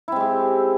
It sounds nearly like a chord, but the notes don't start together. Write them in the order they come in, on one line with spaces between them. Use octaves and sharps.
E4 C4 G#3 G4